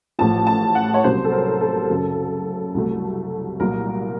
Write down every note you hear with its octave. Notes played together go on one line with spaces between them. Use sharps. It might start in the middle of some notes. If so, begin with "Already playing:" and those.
A1 A2 F3 A5
A5
F#5
C#5
C2 C3 F#3 A#3 C#4 C5
A4
A#4
A4
F#2 C#3 F#3
C2 C3 F#3 A3
C2 A#2 F#3 A#4